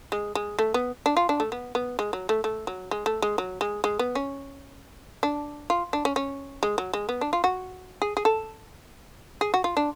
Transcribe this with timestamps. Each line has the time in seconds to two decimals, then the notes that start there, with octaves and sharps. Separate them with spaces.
0.12 G#3
0.35 G#3
0.59 A3
0.74 B3
1.06 D4
1.17 F4
1.29 D4
1.40 A3
1.52 B3
1.75 B3
1.99 G#3
2.13 F#3
2.29 A3
2.44 A3
2.67 F#3
2.91 G#3
3.06 A3
3.22 G#3
3.38 F#3
3.61 G#3
3.84 G#3
3.99 B3
4.15 C#4
5.23 D4
5.70 F4
5.93 D4
6.05 C#4
6.16 C#4
6.63 G#3
6.78 F#3
6.93 G#3
7.09 B3
7.21 D4
7.33 F4
7.44 F#4
8.02 G#4
8.17 G#4
8.25 A4
9.41 G#4
9.54 F#4
9.64 F4
9.77 D4